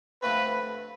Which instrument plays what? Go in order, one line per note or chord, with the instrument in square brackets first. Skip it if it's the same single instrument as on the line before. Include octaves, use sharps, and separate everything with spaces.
[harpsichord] G2 D3 F3 A3 C4 [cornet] B4